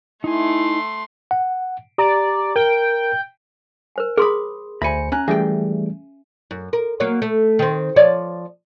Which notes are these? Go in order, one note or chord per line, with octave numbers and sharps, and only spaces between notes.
A3 D#4 E4 G#5 C6
F#5
G4 D5 A#5
A#4 G5
A#4 C5 G#5
G#4 A#4 B5 C6 D#6
D2 C5 E5 G#5 B5 C#7
C#4 G#5 A#5 F#6
E3 G3 A3 C#4 G#4 E5 G5 G#5
F#2
A#4
F#3 A#3 C#5
A3
D#3 C4
F3 C#5 D5